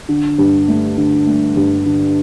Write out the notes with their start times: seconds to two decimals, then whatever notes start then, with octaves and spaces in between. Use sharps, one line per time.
0.09 D3
0.38 G2
0.68 A3
0.97 D3
1.27 A3
1.56 G2
1.86 D3